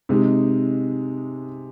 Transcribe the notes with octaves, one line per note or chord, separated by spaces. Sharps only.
C3 G#3 D#4